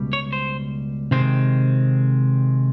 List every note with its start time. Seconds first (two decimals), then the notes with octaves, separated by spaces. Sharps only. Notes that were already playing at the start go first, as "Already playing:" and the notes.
Already playing: C#2 B2 G3
0.13 C#5
0.33 C5
1.11 C3 D#3 G#3 C4 C5